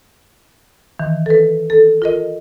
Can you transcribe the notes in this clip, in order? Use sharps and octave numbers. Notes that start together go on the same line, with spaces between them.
D#3 E3
A4 B4
A4
F4 A#4 D#5